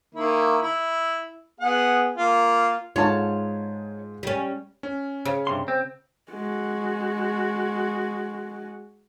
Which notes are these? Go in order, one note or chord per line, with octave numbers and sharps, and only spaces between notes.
D#3 A#3 E4
E4
B3 G#4 F#5
A#3 F4
G#2 G#3 F4 C#5 A5
G3 C#4
C#4
C#3
G2 C3 C6
C4
G#3 F#4